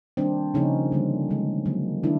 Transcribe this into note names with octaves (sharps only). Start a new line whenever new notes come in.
D#3 G3 A#3 C4 D4
C#3 F3 A#3 C#4 D#4
D3 G3 A#3
D#3 G#3
D3 F#3 A#3
D#3 D4 E4